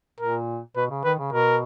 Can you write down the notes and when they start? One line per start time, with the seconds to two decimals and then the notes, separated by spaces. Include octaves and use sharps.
0.20 A#2 A#4
0.76 B2 B4
0.91 C#3
1.04 D#3 B4
1.19 C#3
1.33 B2 A#4